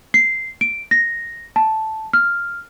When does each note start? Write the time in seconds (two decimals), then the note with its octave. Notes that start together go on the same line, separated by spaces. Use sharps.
0.14 C7
0.61 D7
0.91 A#6
1.56 A5
2.13 F6